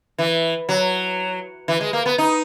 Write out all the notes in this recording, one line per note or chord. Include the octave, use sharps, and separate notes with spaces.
E3
F#3
E3
G#3
A#3
B3
D#4